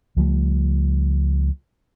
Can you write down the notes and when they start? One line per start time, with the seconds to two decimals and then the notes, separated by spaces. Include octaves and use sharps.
0.17 C#2 F3 G3 A3